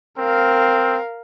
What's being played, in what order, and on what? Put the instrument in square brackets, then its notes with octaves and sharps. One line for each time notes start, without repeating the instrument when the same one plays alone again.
[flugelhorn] C4 [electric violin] A#4 F5